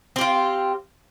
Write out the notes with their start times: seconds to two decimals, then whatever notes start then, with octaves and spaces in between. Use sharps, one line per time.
0.16 C4
0.18 G4
0.21 F4